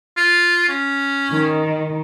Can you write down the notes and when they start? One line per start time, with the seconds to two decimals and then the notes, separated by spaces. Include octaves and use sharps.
0.17 F4
0.69 C#4
1.33 D#3